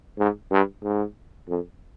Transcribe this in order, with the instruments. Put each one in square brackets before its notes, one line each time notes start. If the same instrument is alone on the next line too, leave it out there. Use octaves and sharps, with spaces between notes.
[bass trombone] G#2
G2
G#2
F2